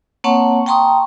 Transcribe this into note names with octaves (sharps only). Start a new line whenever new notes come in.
A#3 C4 C#5 F#5 A5 C#6
G5 A5 A#5 C6 C#6 D#6